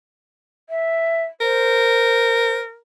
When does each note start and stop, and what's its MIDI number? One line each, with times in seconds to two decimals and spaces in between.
0.70 1.23 76
1.41 2.78 70
1.41 2.56 72